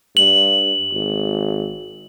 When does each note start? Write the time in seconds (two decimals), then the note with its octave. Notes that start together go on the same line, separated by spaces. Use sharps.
0.17 G2 F#7
0.92 G#1